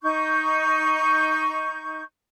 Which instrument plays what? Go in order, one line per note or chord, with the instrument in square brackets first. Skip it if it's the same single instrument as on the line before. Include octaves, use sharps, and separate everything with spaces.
[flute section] D#4 C#6 G6